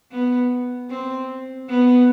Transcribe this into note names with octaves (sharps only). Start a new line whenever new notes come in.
B3
C4
B3